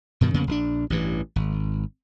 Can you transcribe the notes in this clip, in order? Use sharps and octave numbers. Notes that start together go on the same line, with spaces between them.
G2 B2 D#3
F2 C#3 A#3 B3
A#1 D#3 D4
A1 G2 E3
G#1